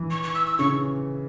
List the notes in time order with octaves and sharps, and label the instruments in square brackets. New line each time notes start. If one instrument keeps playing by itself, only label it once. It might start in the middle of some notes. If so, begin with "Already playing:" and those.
Already playing: [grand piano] E3
[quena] C#6
C#6
E6
E6
[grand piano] C#3 [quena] C#6